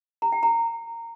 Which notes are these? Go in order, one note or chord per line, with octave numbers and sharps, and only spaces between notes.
A#5
G5
A#5